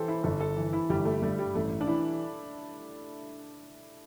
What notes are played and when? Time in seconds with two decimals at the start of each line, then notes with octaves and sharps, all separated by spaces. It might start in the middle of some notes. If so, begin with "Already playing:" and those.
Already playing: E3 G4 A4 C5
0.08 E4
0.24 G1 A4
0.40 A4
0.56 E3
0.73 E4
0.89 G1 G3
1.05 A3
1.22 G2 A3
1.39 G3
1.54 A1 A3
1.81 D4
1.87 E3 E4